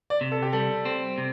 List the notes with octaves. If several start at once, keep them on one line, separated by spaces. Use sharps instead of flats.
D5
C3
A4
G4
G3 A4
C4
C3